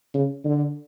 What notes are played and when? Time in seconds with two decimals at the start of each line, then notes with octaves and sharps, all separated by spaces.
0.14 C#3
0.45 D3